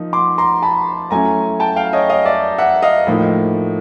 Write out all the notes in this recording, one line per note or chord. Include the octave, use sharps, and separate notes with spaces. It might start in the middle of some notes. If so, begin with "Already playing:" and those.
Already playing: F3 A#3 D#4
C6 D6
A#5 C6
A5 B5
F#3 A3 C#4 E4 G#5 A#5
G5 A5
F5 G5
C#5 D#5
D#5 F5
D5 E5
E5 F#5
D#5 F5
A2 F3 A#3 D#4